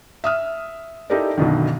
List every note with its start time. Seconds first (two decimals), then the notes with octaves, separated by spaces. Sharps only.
0.24 E5 D#6 F6
1.10 D#4 E4 G4 A4 A#4 D5
1.37 B1 F#2 B2 D3 D#3